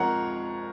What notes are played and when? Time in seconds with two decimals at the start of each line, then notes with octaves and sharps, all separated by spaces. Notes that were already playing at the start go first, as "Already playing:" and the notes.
Already playing: F2 F3 G#3 A#4 C#5 F#5 A#5